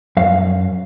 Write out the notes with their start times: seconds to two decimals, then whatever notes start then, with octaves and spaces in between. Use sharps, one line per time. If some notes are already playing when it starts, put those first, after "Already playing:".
0.17 F#2 F5